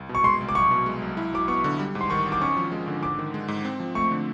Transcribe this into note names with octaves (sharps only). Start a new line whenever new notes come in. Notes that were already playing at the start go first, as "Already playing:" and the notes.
Already playing: C2
B2
C#6
G#3 C6
C2
D6
B1 C#6
B2
G#3
B1
E4
F#3 D6
B3 C#6
D3
G3
G#2
C6
D#3 C#6
G#1
D6
C#4 C#6
F3
G#3
D3
G#2 D6
D#3
G#3
G#2
C4
F3
A3 C#6
D3